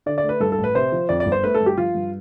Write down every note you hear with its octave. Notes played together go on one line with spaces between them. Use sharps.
D3 D5
D5
A3
B4
G2 A4
A4
A1
B4
C3 C5
F3
F2 D5
D5
G1
C5
A3 B4
A4
G2
G4
F3 F4
G2